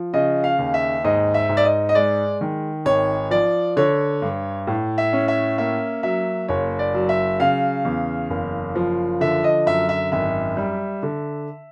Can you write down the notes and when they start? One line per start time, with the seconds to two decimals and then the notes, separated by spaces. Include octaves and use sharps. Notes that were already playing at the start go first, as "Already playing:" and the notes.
Already playing: F3
0.14 C#3 D#5
0.44 F5
0.59 D#2
0.74 E5
1.04 G#2 D#5
1.34 E5
1.49 G#2
1.57 D5
1.65 D#5
1.89 D#5
1.95 G#3 D5
2.41 D#3
2.85 G#1 C#5
3.31 F3 D5
3.77 D3 C#5
4.22 G2
4.67 A2
4.98 E5
5.13 C#4
5.28 E5
5.58 A#3 E5
6.03 F#3 E5
6.48 F#1 C#5
6.79 D5
6.94 F#3
7.09 E5
7.39 C#3 F5
7.85 E2
8.30 F#1
8.76 F3
9.21 D3 E5
9.44 D#5
9.66 F#2 E5
9.89 E5
10.12 G#1 E5
10.57 G3
11.03 D3